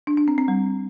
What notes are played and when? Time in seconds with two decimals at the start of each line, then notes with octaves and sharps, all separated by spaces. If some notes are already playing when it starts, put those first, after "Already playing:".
0.07 D4
0.17 D4
0.28 C4
0.38 C4
0.48 G3